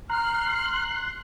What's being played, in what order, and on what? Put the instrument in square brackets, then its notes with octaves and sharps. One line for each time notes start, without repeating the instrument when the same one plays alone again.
[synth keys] A#5 [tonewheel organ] C6 F#6 [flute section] F6